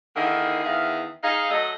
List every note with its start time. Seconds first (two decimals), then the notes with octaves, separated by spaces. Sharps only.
0.15 D3 D#3 A#3 D#4 E4 G#4
0.63 E2 D#3 G#4 E5 F5
1.22 D#4 G#4 F5
1.50 F#3 A3 A4 D#5